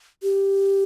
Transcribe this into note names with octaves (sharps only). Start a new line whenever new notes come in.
G4